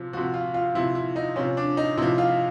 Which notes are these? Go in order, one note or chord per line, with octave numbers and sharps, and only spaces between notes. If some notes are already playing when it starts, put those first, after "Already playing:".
Already playing: C3 F3
C3 F3 F#4
F4
F4
C3 F3 E4
E4
D#4
C3 F3 C#4
D4
D#4
C3 F3 E4
F4